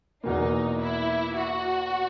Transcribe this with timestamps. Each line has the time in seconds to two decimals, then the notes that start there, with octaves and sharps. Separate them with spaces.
0.23 E2 B2 A#3 D#4
0.80 E4
1.36 F#4